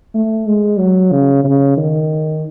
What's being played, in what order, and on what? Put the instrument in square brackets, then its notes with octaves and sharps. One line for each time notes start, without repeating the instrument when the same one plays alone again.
[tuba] A3
G#3
F#3
C#3
C#3
D#3